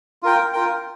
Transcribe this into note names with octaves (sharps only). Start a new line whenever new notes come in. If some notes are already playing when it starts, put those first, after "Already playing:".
F4 A#4 G5
F4 A#4 G5